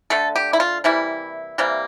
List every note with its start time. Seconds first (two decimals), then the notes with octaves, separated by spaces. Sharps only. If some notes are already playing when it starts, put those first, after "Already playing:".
0.10 D3 A3 A4
0.36 G4
0.53 E4
0.60 F4
0.84 C3 E3 G3 A#3 E4
1.58 C3 E3 G3 A#3